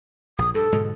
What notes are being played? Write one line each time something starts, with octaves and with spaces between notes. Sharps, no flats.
A#1 D#6
G2 A4
G#2 B2 D3